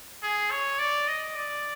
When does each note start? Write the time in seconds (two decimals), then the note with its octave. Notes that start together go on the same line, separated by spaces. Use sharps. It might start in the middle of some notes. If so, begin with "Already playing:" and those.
0.23 G#4
0.51 C#5
0.79 D5
1.08 D#5
1.36 D5